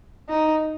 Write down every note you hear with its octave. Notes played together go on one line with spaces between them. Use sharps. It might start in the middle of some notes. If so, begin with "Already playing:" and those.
D#4